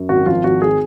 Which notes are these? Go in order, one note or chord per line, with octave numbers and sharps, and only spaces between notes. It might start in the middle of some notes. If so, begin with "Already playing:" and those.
Already playing: F#2
G#1 F#4
F3 F4
G#1 F#4
G#4